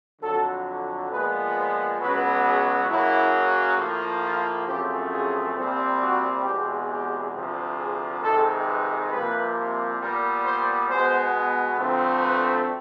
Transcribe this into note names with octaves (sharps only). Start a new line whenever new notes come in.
F2 D3 F#3 A4
A#2 F3 G#3 B3 B4
C5
C#2 B2 F#3 B3 B4
G#4
F#2 C#3 F#3 A#3 E4
A2 F3 A#3
F4
F#2 C#3 F3 A3 C4 G4
G#4
C2 A#2 G3 C4
F#4
E2 B2 G#3 C4 G4
G4
D2 C3 F3
G#4
F2 C3 D#3 G#3 A4
B4
C2 C3 F3 A#3 B4
A#2 G3 B3 A#4
C5
B2 G#3 B3 C5
D2 D3 F3 A3 C4
B4